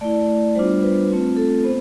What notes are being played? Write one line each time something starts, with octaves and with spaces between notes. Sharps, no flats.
A3 E4 D5
G3 B3 D4 F4 C5
B4
A3 C4 F4
A4
B3 C5